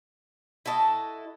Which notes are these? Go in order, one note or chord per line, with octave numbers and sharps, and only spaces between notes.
E4 F#4 A4 D#5